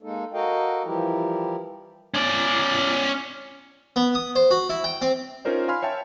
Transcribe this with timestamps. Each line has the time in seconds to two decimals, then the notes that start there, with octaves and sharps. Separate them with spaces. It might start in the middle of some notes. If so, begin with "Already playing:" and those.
0.03 G#3 A#3 D#4 A4
0.34 F#4 A4 A#4 D#5 F5 G5
0.85 E3 F3 G3 E4 G4 A#4
2.14 C#4 D5
3.96 B3
4.15 D#6
4.36 C5
4.51 F#4
4.70 E4
4.84 G5
5.02 C4
5.45 C#4 D#4 F4 A#4 C5 D5
5.68 F5 G#5 B5 C6 F6
5.82 C#5 E5 G5 A5